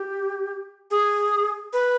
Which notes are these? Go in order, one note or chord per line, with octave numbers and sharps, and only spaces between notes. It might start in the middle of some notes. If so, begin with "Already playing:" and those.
Already playing: G4
G#4
B4